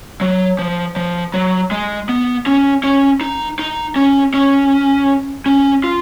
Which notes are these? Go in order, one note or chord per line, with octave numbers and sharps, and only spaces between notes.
F#3
F3
F3
F#3
G#3
B3
C#4
C#4
D#4
D#4
C#4
C#4
C#4
F4